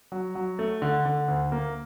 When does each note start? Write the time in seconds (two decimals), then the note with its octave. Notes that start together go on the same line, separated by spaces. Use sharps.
0.12 F#3
0.35 F#3
0.59 A3
0.82 D3
1.05 D3
1.28 D2
1.52 A#3